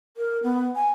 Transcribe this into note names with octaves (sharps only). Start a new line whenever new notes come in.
A#4
B3
G#5